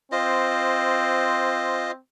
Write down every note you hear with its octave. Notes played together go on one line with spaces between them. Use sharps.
C4 F4 C5 D#5